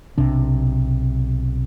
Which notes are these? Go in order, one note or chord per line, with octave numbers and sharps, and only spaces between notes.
B1 C3 D4